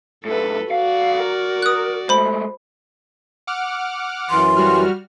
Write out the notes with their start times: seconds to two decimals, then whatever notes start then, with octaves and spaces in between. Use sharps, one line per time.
0.25 F#2 A2 A4 B4
0.71 B1 F#4 D5 F5
1.20 A#4
1.62 D#6 F#6
2.09 G#3 A3 C5 B5
3.47 F#5 D6 F6
4.30 F#2 E3 C6
4.57 G3 F#4 F6